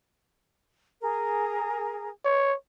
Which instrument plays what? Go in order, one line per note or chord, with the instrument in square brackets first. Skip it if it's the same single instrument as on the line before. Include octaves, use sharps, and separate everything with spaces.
[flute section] G#4 A#4
[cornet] C#5